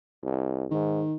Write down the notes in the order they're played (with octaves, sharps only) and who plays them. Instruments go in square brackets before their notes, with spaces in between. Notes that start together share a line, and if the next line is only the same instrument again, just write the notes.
[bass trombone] C2
[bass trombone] G#2 [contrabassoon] D#3